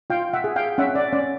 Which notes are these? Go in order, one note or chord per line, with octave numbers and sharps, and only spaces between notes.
F4 F5 G5
E5 F#5
G#4
F5 G5
C#4 E5 F#5
D5
C#4 D5